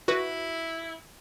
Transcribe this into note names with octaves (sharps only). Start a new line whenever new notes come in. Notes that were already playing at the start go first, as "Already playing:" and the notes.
E4 F#4 B4